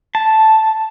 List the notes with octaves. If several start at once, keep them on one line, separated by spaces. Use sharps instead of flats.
A5